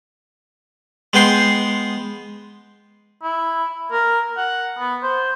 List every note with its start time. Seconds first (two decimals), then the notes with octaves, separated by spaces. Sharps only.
1.13 G#3 B3 G5 C6
3.23 E4
3.92 A#4
4.37 F#5
4.79 B3
5.03 C5